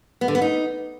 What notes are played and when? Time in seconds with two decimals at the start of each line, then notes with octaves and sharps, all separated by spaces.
0.21 B3
0.28 D3
0.35 B3
0.42 D#4